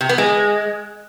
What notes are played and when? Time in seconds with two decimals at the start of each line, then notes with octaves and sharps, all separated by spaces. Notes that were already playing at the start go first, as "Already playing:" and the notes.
0.01 C3
0.09 B3
0.18 G#3